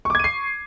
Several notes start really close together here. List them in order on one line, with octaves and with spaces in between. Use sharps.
C#6 D6 G#6 D#7 C7